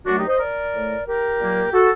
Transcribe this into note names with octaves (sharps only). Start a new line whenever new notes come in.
F#2 F#3 A3 D4 F#4
D#4 G4
C5 D#5
A#4 D5
A2 A3
G4 A#4
A#2 F#3 A#3
F#4 A4